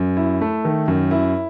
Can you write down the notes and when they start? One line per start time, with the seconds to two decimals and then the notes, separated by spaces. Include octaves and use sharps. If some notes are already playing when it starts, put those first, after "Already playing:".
Already playing: F#2
0.17 E4
0.41 A3
0.65 D#3
0.88 F#2
1.11 E4